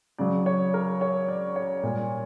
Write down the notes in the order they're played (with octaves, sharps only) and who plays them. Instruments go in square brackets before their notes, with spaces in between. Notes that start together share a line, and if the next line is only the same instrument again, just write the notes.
[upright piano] C#3 F#3 D5
C#5
A#4
C#5
D5
C#5
A#2 G3